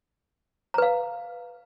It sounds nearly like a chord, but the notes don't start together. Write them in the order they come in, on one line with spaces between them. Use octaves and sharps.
A#5 B4 F5